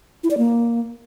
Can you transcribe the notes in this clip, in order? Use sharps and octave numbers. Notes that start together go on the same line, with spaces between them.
E4
D5
A#3